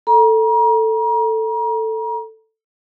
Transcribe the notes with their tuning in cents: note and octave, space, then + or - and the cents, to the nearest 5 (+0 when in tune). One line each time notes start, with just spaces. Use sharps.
A4 +10 A#5 +35